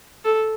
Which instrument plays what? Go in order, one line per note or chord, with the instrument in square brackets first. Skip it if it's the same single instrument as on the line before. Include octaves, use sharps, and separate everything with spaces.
[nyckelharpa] A4